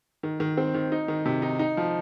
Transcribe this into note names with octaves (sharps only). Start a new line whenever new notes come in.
D#3
D#3
C4
D#3
D#4
D#3
C3
D#4
D#4
F3